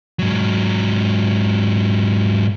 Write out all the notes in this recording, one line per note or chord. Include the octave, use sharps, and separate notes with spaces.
G#2 F#3